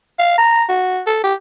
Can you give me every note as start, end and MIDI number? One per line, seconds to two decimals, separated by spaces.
0.19 0.37 77
0.38 0.64 82
0.69 1.01 66
1.07 1.20 69
1.24 1.34 67